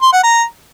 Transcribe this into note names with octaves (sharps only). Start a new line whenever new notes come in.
C6
F#5
A#5